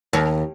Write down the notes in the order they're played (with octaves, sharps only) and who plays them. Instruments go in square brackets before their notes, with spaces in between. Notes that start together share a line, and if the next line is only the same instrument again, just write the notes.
[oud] D#2